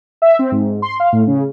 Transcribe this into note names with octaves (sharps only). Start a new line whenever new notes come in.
E5
C4
G#2
C6
F5
A2
C#3